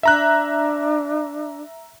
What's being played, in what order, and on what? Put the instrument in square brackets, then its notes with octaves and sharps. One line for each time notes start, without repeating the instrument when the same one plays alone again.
[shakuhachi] D4 [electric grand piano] E5 A#5 F#6